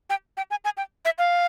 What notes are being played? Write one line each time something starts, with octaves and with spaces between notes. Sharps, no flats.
G5
G5
G#5
G#5
G5
E5
F5